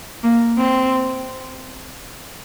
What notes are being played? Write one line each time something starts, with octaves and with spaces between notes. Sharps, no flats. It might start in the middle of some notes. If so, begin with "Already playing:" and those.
A#3
C4